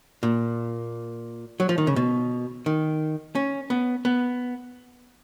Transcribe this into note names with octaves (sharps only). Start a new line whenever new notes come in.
A#2
F#3
F3
D#3
C#3
B2
D#3
C#4
B3
B3